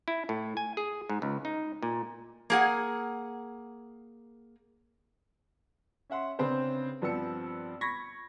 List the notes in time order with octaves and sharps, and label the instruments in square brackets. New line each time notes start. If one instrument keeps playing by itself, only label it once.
[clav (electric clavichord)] E4
A2
G#5
G#4
G#2
C#2
D#4
A#2
[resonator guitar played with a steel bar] A#3 G#4 F#5
[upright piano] C#4 E5 F#5 C6
C#3 C4 D4 B4 C5
G2 F3 B3 C4 E6 C#7
B5 C#6 G#6 A#6 B6